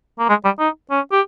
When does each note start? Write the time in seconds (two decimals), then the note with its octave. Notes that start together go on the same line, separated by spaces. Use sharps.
0.19 A#3
0.29 G#3
0.45 G3
0.59 D#4
0.90 C#4
1.12 G4